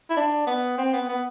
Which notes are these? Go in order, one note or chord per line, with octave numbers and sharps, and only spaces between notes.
E4
D4
B3
C4
B3
B3